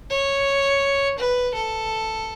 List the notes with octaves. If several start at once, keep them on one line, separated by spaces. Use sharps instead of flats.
C#5
B4
A4